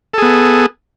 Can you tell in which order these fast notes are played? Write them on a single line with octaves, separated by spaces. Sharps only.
A4 G#4 B3